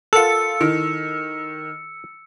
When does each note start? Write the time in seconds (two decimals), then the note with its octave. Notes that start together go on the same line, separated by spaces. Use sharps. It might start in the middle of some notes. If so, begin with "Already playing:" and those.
0.13 F4 A4 A#4 F#5 E6 A6 C#7
0.61 D#3 E4